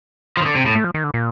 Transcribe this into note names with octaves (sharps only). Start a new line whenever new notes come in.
F3
D#3
D3
C3
A2
A3
F3
D#3
D3
A#2